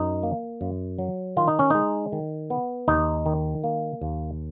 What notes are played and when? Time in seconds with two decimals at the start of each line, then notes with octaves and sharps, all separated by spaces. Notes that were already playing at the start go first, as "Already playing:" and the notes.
Already playing: F#2 D#4
0.23 A#3
0.61 F#2
0.98 F#3
1.37 D#3 F4
1.48 D#4
1.59 C#4
1.70 G#3 D#4
2.12 D#3
2.50 B3
2.88 D#2 D#4
3.26 D#3
3.64 A#3
4.02 D#2